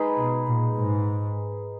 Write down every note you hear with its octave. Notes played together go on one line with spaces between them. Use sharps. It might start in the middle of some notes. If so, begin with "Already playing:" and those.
Already playing: G#3 D#4 G#4 B4
B2
A#2
G#2